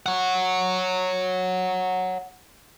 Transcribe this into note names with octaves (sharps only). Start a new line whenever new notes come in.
C#5 F#5